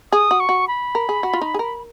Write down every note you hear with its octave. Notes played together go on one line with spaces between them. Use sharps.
G#4 D#6
F#4
C#6
F#4
B5
A#4
G#4
F#4
F4
D#4
G#4
A#4